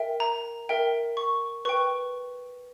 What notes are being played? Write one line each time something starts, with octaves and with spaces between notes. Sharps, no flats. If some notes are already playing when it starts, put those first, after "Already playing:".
Already playing: A#4 E5 G5
A#5
A#4 E5 G5
C#6
B4 G5 C#6